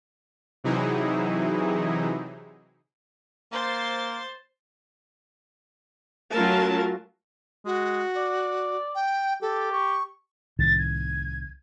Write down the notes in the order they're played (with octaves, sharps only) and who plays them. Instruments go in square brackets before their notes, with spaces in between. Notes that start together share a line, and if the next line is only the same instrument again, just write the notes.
[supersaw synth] C3 E3 F#3 D#4 E4 G#4
[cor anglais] A#3 [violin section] C5 C6 A6
[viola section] F#3 A3 C#4 F4 A#4 A5
[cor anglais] G#3 [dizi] F#4
[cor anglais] D5
[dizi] G5
[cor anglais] G4 [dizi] A4
[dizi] C#6
[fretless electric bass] C2 A2 D#3 [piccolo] A6
[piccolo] G#6